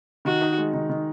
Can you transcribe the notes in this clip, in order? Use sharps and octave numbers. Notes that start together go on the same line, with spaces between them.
D#3 F#4
D#4
G#3
D#3
D#3